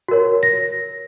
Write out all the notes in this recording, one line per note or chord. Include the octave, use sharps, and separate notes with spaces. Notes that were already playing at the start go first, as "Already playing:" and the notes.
F#4 A#4 C#5
A#6